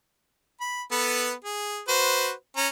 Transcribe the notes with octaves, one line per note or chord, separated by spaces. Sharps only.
B5
B3 A4 B4
G#4
F#4 B4 C5
C#4 A#5